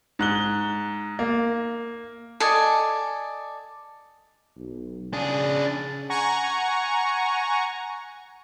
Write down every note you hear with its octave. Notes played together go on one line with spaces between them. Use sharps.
G#2 F#6 G7
A#3
A4 D5 D#5 G#5
B1
C#3 D4 G#4
F#5 G#5 A#5 C#6